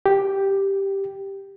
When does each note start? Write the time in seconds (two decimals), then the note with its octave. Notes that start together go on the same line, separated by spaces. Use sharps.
0.06 G4